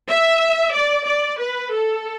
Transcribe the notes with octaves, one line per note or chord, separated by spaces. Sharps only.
E5
D5
D5
B4
A4